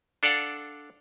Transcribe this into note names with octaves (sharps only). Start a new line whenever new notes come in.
D4 A4 D5 F5 F#5